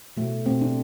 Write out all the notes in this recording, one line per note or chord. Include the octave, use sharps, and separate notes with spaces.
B2 A3
B2 A3 C4
D4